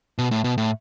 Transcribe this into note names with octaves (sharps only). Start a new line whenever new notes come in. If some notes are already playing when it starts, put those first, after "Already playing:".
B2
A2
B2
A2